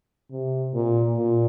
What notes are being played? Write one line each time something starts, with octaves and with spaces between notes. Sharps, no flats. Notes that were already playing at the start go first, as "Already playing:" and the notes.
C3
A#2
A#2